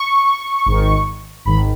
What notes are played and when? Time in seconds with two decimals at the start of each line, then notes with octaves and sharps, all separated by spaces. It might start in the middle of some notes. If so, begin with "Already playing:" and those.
Already playing: C#6
0.66 G#1 G#2 D#3
1.45 G#1 G#2 D#3 B5